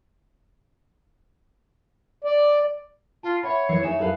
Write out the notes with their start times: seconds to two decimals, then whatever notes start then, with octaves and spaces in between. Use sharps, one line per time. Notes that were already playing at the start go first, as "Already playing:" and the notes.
2.24 D5
3.23 F4 A5
3.43 C#5 E5 F#5 B5
3.69 E3 C7 C#7
3.83 D#4 C#5 E5 G#5 E7
4.00 A4 B4 F5